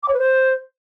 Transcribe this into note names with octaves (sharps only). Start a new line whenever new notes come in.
D6
C#5
B4
C5